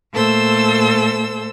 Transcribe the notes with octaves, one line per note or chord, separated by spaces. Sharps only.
A#2 A3 A4 C5 E6